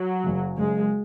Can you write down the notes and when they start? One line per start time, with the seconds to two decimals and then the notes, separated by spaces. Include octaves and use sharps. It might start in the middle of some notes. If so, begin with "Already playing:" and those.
Already playing: F#3
0.24 F#1 F#2 C#3
0.57 F#1 F#2 C#3 G#3